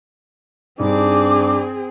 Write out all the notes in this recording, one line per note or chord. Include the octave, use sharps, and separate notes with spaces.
G2 C4 D4 D#4 G#4 D6